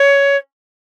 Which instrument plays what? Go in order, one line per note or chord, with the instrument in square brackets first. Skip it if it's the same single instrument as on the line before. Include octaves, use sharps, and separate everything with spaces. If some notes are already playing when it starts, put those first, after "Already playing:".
Already playing: [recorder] C#5